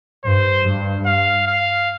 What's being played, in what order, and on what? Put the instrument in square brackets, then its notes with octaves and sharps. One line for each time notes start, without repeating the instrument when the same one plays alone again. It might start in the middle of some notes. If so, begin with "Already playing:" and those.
[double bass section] G2 [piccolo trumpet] C5
[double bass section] G2
[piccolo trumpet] F5
F5